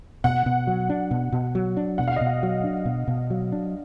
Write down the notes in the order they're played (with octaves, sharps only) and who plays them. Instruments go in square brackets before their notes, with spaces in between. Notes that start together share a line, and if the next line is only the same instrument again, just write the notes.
[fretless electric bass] B2 [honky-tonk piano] F#5
[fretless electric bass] B2
F#3
D4
B2
B2
F#3
D4
[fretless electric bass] B2 [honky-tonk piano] F#5
[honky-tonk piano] F5
D#5
[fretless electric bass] B2
[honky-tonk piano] F5
[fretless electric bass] F#3
D4
B2
B2
F#3
D4